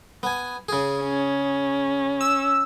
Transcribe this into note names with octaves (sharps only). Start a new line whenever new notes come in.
B3 G#5
C#3 G#4
C#4
E6